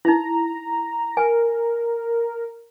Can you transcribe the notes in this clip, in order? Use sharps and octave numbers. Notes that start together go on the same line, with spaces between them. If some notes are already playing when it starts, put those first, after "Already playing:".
D#4 E4 A#5
A#4 G#5